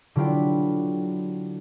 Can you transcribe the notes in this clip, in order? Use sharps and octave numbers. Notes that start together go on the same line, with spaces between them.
D3 F#3 E4 F4 G4 B4